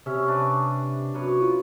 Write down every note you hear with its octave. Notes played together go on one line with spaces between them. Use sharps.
C3 C#4 E5
D4 B4 D5
F#2 B4 C#5
F4